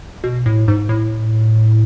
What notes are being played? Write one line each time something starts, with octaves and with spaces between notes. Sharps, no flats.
B2
A2
G#2
A2